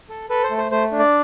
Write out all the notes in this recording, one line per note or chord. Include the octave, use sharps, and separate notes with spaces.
A4
A4 B4
C5
A3
C5
A3 C5
D4
D5